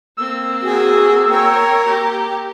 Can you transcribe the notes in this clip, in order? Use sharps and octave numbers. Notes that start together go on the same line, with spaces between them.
A#3 C4 E6
F#4 G#4
A#3 A#4 C#5 G5
G4